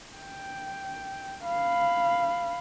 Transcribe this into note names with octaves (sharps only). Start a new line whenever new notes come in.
G5
F5 B5